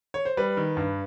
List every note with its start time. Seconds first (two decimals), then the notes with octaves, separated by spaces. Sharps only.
0.14 C#5
0.25 C5
0.37 G3 B4
0.57 D#3
0.77 G2